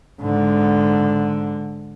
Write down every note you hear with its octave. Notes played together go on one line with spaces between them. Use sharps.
G#2 D3